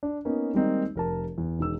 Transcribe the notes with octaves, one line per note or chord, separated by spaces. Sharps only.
D4
A#3 B3 C#4 D#4
D#3 G3 G#3 A#3 C4 D#4
F1 A#4 A5
E2
E1 D#3 E6